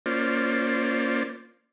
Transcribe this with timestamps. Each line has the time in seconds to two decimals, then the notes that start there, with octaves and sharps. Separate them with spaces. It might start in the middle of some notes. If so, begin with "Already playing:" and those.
0.06 A#3 C#4 F4 C5 D5